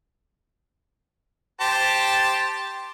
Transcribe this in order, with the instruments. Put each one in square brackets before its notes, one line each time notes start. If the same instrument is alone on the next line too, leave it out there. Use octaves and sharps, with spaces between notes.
[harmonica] G4 C5 A5